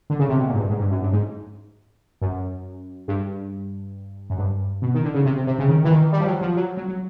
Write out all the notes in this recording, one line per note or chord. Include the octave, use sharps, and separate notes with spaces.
D3
C#3
C3
B2
A#2
G#2
G2
G#2
G2
F#2
G2
G#2
F#2
G2
F#2
G2
B2
D#3
D3
C#3
C3
C3
C3
C#3
D#3
E3
D#3
G3
F3
F#3
F3
F#3
F#3
F#3